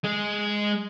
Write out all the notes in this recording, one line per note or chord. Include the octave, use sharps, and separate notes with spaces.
G#3 G#4